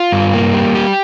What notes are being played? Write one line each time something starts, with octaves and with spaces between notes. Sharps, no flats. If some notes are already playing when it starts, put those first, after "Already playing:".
Already playing: F4
G2
A#3
G3
G4